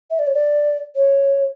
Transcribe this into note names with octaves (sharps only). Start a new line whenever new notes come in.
E5
D5
C#5
D5
C#5